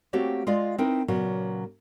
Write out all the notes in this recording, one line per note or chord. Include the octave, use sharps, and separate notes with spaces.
A3 A#3 C4 F#4 G4 C#5
G#3 F4 D5 D#5 F5
C4 D#4 E4 A#4 B4
A#2 C#3 F#3 A#3 B3